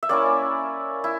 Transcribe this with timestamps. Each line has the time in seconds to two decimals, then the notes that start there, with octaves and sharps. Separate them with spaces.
0.03 E5
0.09 A#3 C#4 E4 D5
1.04 E4